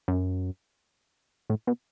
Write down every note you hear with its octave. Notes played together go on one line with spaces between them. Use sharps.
F#2
A2
B2